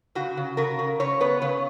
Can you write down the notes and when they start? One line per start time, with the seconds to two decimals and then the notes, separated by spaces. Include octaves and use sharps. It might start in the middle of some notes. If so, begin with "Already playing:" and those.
0.15 C#3 F#4
0.37 C#3
0.57 C#3 A#4
0.79 C#3
1.00 C#3 C#5
1.20 B3 B4
1.42 C#3 C#5